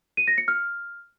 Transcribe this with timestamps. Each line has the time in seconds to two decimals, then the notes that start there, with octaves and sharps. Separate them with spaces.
0.17 D#7
0.28 A#6
0.38 C#7
0.48 F6